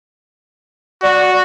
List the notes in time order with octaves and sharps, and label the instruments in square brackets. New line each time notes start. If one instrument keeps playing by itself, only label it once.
[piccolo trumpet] F#4 [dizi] D5